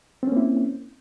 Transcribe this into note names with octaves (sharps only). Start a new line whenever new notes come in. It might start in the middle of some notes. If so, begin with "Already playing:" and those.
A#3 C4 C#4 E4